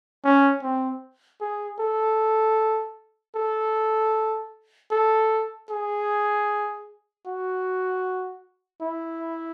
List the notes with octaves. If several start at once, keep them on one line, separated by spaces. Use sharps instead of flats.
C#4
C4
G#4
A4
A4
A4
G#4
F#4
E4